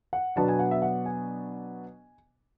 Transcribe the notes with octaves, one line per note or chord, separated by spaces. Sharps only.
F#5
B2 F#3 B3 D4 A5
G#5
F#5
E5
F#5
G#5